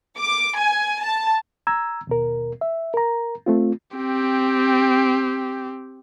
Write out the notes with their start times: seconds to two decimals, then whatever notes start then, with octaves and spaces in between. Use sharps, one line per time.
0.19 D6
0.59 G#5
1.04 A5
1.67 A#5 E6 G#6
2.07 D#2 B2 A#4
2.61 E5
2.94 A#4 A#5
3.46 A3 C4 F4
3.97 C4 G4